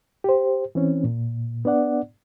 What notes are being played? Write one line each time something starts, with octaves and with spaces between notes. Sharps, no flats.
G4 C5
E3 C4 C#4
A#2
B3 D4 D5 F#5